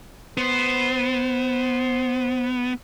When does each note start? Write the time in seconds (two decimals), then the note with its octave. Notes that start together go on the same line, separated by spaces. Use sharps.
0.37 B3 C5